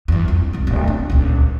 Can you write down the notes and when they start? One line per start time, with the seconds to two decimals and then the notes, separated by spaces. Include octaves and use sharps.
0.08 E2 G2
0.28 F2
0.53 E1 C2
0.67 D1
0.88 D4
1.10 D#1 C#2